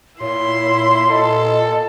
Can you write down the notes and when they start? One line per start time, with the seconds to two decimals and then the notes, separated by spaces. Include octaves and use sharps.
0.21 A#2 E4 C#5 C6
1.10 A4 D#5